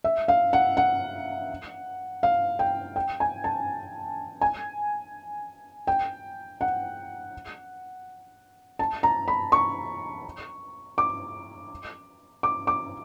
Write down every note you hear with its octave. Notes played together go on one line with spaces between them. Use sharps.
E5
F5
F#5
F#5
F5
G5
G5
G#5
A5
G#5
G5
F#5
A5
A#5
B5
C#6
D6
D6
D6